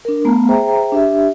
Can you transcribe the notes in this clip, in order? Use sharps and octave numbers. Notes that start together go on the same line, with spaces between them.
D4 A#4
A3 B3 A#5
G#4 C5 E5 G5 A#5
D4 G4 E5